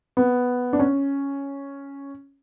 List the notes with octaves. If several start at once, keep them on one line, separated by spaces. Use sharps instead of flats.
B3
D4
C#4